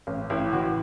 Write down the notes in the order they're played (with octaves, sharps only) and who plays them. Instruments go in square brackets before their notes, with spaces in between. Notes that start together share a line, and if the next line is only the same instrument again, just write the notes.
[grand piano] A1
A1 E4
E3 F#4